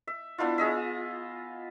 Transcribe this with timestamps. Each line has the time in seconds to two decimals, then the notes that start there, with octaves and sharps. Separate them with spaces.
0.07 E5
0.38 B3 D4 E4 F4
0.58 F4 G#4 D#5 E5